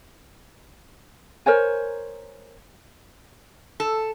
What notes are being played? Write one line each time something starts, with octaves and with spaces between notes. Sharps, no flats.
A#4 C5 C#5 G#5
A4